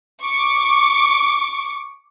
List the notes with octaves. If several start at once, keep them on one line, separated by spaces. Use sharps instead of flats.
C#6 D6